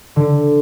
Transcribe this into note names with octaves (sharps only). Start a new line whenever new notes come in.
D3